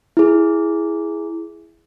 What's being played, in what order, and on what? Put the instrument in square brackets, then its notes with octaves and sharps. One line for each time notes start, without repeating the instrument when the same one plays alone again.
[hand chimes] E4 G#4